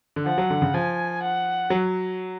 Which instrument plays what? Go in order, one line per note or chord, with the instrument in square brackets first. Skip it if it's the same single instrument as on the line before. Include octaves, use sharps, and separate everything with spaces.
[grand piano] D3
[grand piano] F3 [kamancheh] F#5
[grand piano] F#3
D3
C#3
[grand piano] F3 [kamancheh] G#5
[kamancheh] F#5
[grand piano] F#3